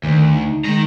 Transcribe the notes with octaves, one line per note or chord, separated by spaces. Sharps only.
D2 D#3
D#4
D#3 G#3 A#5